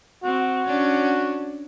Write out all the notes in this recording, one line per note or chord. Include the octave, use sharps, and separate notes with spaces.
C4 F#4
C#4 D4